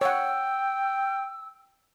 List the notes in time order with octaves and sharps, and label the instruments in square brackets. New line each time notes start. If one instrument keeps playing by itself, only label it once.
[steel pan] C#5 F#5 [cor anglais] G5 [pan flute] E6